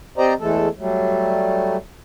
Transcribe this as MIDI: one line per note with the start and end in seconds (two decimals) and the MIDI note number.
0.18 0.34 60
0.18 0.34 67
0.18 0.34 72
0.18 0.34 74
0.18 0.34 75
0.18 0.34 82
0.40 0.68 40
0.40 0.68 52
0.40 0.68 56
0.40 0.68 57
0.40 0.68 69
0.79 1.77 54
0.79 1.77 55
0.79 1.77 57